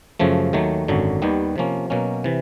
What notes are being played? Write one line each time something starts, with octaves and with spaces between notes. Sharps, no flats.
F#2 C#3 F3 A3
D#2 D#3 F#3 A3
G#1 F#2 D3 F#3
D#2 D#3 G3 B3
C3 F3 A#3 C#4
B2 F#3 A#3 C#4
C3 E3